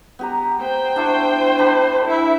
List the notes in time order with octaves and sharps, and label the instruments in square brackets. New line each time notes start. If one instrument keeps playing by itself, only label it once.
[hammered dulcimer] B3 G4 A#5
[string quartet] C5 G5
[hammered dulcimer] D4 E4 C#6
D4 B5
[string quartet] E4 E5